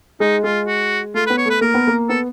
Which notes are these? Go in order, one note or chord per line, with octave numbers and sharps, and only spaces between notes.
G#3 D#4
G#3 F4
F#4
A3 F4
B4
B3
C#5
A3 B4
A#3 A#4
B3
A#3
B3 A4